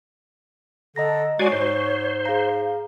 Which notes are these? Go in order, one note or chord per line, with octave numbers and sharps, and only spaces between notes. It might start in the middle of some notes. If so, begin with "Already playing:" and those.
D3 A4 D#5 A#5 A#6
G#3 F#4 C#5 D5 G#5 C7
G#2 C5
G#4 F5 A#5